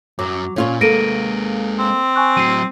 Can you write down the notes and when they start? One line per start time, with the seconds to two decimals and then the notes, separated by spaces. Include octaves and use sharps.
0.19 F#2 F#3 D6
0.56 A#2 C#4 F4 C#5
0.81 G#3 A#3 A4 B4 A#6 D7 D#7
1.79 C4
2.16 G#5 C#6 F#6
2.37 A2 F#3 C7 D#7